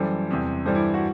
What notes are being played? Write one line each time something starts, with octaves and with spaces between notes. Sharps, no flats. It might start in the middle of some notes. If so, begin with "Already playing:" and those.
Already playing: F#2 E3 G3 A4 C5
E2 C3 G3
G2 E3 G3 A4 C5
E4
F#4